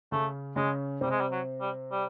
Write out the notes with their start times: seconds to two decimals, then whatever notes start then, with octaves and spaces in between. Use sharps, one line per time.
0.12 C#3 A3 C#4
0.56 C#3 G#3 C#4
1.01 C3 G3 C4
1.11 G#3
1.21 G3
1.32 F#3
1.61 G3
1.91 G3